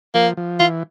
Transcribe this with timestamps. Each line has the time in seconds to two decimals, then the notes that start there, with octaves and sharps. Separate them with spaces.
0.14 F3 A#3
0.37 F3
0.59 E3 F4